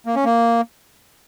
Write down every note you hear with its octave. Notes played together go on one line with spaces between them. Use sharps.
A#3
C#4
A#3